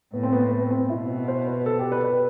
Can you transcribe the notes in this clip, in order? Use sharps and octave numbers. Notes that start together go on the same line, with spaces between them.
A2 B3
C4
B3
B3
C4
B2 E4
C5
B4
A4
G4
B4
B4